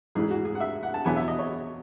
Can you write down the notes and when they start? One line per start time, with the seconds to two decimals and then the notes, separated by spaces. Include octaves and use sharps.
0.15 A1 G#2 E3 G#4
0.31 F#4
0.45 G#4
0.55 F#5
0.60 E5
0.83 F#5
0.94 A5
1.05 E2 B2 F#3 B3 E4 G#5
1.16 E5
1.28 D#5
1.39 C#5